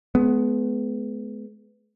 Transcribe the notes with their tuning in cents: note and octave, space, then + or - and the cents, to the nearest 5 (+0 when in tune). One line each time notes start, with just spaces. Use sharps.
G#3 +45 B3 +15